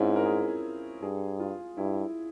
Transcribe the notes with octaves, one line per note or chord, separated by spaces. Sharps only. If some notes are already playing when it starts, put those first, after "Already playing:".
Already playing: G#2 C4 C#4 E4 F4
A#4
G#4
G2 G#4
F4
G2 E4